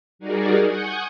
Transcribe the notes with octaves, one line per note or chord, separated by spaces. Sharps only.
G3 D#4 F#4 G#4 A#4 D5
F#5 G#5 C#6 D#6 G6